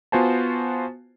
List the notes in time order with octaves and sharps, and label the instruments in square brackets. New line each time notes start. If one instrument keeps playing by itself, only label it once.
[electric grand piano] B3 F4 F#4 C5 G#5 A5